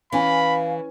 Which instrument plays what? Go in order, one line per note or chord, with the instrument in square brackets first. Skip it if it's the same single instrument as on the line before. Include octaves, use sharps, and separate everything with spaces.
[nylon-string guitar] E3 [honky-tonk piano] C#4 G#5 [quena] F5 [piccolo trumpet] B5